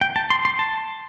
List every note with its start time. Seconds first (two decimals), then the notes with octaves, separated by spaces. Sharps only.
0.01 G5
0.16 A5
0.30 C6
0.45 C6
0.59 A5